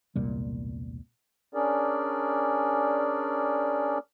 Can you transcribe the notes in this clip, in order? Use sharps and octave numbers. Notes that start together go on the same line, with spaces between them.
E1 C2 A#2 G3
C#4 D4 G#4 A#4 D5